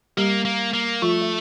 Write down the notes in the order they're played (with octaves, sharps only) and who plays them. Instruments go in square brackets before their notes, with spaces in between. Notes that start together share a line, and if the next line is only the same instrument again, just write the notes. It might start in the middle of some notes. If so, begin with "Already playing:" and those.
[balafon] G3 G4 [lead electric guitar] A#3
[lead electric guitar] A#3
A#3
[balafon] F3 F4 [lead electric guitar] A3
[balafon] E5